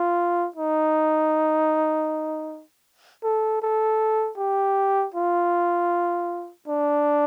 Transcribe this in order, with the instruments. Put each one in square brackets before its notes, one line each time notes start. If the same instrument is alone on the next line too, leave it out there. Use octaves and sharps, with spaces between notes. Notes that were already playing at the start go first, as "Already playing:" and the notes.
Already playing: [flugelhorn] F4
D#4
A4
A4
G4
F4
D4